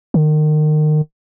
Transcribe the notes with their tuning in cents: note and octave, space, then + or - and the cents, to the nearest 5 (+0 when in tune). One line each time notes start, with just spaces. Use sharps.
D#3 -30